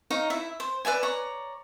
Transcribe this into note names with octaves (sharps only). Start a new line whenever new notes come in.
D#4 C#5 F5 A#5
E4 E5
C5
B4 D5 E5 G#5
C#5 D5 A#5